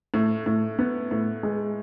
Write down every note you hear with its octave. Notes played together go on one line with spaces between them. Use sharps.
A2
A2
B3
A2
G#3